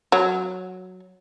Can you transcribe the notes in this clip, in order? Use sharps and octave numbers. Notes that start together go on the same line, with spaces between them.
F#3